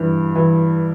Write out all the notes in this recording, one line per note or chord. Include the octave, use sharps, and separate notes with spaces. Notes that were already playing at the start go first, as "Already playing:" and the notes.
Already playing: G2 E3
E3